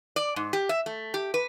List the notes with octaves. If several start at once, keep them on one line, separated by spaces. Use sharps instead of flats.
D5
G#2
G4
E5
A3
G4
B4